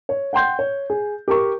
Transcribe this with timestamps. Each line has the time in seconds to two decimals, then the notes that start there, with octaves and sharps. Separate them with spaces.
0.09 C#5
0.33 F#5 G5 C6 G6
0.59 C#5
0.90 G#4
1.28 G4 A#4 C#6